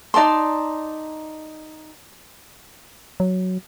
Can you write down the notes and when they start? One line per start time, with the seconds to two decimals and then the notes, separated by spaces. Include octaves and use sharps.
0.14 D#4 D5 A5 C6
3.20 F#3